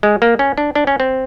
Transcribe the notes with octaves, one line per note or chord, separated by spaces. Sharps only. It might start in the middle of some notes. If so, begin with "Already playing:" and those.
G#3
A#3
C#4
D4
D4
C#4
C4